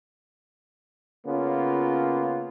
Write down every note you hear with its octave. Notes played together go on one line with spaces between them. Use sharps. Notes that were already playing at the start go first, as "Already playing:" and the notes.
C#3 A#3 B3 C#4 F4